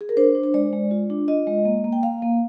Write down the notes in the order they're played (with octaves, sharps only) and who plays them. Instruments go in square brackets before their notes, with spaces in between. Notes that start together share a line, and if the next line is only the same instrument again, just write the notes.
[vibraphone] G#4
A#4
D4 C5
D4
C5
G#3 D5
G#3
F4
D4
F4 D#5
G#3
A#3
A#3
G5
A#3 F5
A#3